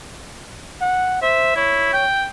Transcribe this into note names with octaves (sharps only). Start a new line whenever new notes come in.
F#5
C5 E5
E4 C#5
G5